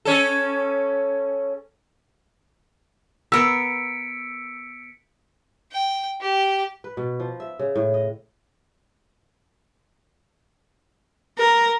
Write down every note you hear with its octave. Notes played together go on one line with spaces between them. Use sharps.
C#4 A4
B3 A#4 E6 B6 C#7 D7
G5
G4
B4
B2
F3
E5
C#3
A2
D#5
A#4